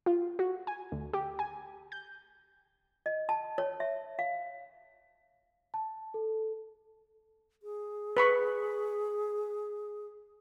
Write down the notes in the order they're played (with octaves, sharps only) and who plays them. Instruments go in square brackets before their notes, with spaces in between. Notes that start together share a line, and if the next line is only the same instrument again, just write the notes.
[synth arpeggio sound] F4
F#4
G#5
D2
G4
G#5
G6
[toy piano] D#5
A5
C#5
E5
F5
[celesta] A5
A4
[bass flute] G#4
[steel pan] B4 B5 C#6